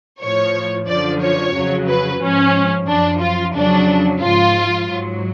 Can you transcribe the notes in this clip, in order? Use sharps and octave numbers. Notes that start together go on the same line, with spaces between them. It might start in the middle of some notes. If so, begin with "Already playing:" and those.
A2 F3 C#5
F#2 D3 F3 D5
C#5
F2 C#3 F#3
B4
G#2 F3 C#4
F#2 F3 D4
F4
F2 C#3 F#3 D4
G#2 F3 F4
G#2 F#3